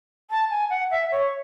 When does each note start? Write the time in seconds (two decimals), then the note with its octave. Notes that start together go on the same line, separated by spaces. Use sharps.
0.30 A5
0.50 G#5
0.70 F#5
0.91 E5
1.12 C#5